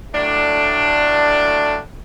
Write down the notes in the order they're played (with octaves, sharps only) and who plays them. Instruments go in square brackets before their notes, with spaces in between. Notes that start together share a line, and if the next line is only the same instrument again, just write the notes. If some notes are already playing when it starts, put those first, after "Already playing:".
[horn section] A2 F#3 A3 D4